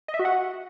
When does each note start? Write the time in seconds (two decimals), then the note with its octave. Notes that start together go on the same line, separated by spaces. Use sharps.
0.08 D#5
0.14 E5
0.19 F#4
0.25 F#5